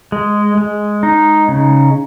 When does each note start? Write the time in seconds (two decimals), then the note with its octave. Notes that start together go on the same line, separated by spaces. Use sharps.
0.12 G#3
0.57 G#3
1.03 D#4
1.48 C#3